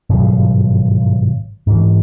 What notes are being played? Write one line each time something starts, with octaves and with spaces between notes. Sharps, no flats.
G#1 G2 B2 F#3
G#2 E3